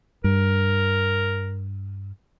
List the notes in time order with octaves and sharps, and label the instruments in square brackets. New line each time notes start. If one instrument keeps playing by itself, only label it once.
[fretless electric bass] G2 [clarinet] A#4